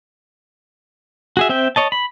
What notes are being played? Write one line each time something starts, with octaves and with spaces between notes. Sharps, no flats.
F#4 G#4 E5
C4 E5 G5
C#5 D#5 A5
B5